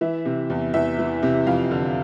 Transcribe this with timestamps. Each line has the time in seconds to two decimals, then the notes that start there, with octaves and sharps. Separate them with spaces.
0.01 E3 E5
0.25 C3
0.50 E2
0.74 E2 E5
0.99 E3
1.23 C3
1.47 F2 F5
1.71 D3